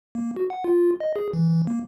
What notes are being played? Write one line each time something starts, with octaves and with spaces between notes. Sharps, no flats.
A#3
F#4
F#5
F4
D#5
G#4
E3
E3
A#3